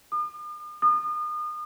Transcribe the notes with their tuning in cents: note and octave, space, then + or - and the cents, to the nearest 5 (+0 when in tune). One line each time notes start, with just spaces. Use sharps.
D#6 -45
D#6 -35